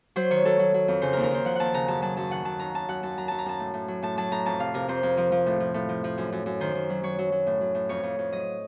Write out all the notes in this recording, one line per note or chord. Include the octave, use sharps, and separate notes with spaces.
F#3 C5
D#3 C#5
F#3 A4
F#3
F#3
F2
C#3 C5
D#2 A#4
A#4
D#2 C5
F3 F#5
D#2 F#5 A5
C#3 A#5
F#2 A5
F#3 A5
F#2 A5
D#3 F#5
F#3 A5
D#3 A#5
F#2 A5
F#2 F#5
F#2 A5
F#3 A#5
F#2 A5
A#5
F#2 A5
A2
A2
F#3
A2 A5
F#3 A5
A2 A#5
F2 A5
C3 F5
C3 A#4
F2 C5
F2
F3
F3
A2
F3
A2
F3
F3
F#2
F#2
F#2
D#3 C5
D#3
F#3
F#3 C#5
F#3
F#3
A2
F#3
A2
F2 C#5
F2
F2
F#3 D#5